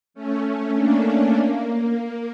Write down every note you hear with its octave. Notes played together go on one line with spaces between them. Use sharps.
A3 C#4
A#3 D4
A3 C#4
A#3
A#3